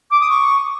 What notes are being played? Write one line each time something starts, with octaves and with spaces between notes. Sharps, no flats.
D6
D#6
C#6